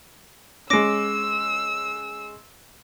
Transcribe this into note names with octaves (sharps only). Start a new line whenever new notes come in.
G#3 C#4 D6 E6 A#6 D7